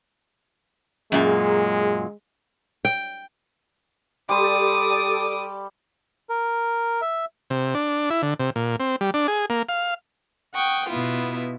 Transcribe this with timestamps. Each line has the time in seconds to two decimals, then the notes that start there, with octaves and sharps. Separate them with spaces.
1.12 F#2 A#2 G#3 G#4
2.85 G5
4.29 G3 G4 A4 D5 C6 D6 D#6
6.29 A#4
7.02 E5
7.50 C3
7.75 D4
8.10 E4
8.22 D3
8.40 C3
8.56 A#2
8.80 C4
9.01 G3
9.14 D4
9.28 G#4
9.50 A#3
9.69 F5
10.54 F#5 G5 C#6 D#6
10.88 B2 B3 E4 F4